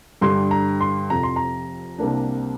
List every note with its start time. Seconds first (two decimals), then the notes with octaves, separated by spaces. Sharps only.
0.21 G2 D3 G3 C6
0.51 A#5
0.81 C6
1.10 F1 F2 C3 F3 A#5
1.23 C6
1.36 A#5
1.99 C2 C3 A#3 D4